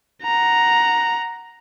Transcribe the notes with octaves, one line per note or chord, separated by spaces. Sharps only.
F#5 A#5